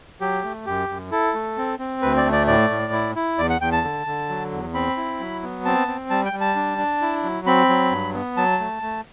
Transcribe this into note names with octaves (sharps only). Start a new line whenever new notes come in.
F#3 G4
A3
F#2 G4
F#2
E4 A4
A3
C4
C4
D2 B4
D5
A3
D5
A2 D5
A2
E4
E4
E2 D5
F#5
E2 G5
A5
D3
D3
F#3
E2
C4 B5
E4
F#3
B3
C4 A5
C4
G3 A5
G5
G3
A5
D4
D4
E4
F#3
C4 B5
F#3
G2
B3
F#3 A5
A3
A3